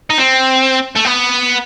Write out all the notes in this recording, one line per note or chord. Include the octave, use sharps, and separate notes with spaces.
D#4
C4
A3
B3